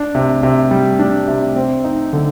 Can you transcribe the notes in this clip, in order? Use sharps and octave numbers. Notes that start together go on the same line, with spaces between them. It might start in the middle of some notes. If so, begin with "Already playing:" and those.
Already playing: D4
C3
C3
G3
D4
C3
C4
D#4
D3